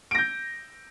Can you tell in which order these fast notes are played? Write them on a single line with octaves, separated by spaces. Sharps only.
D7 A#6 G6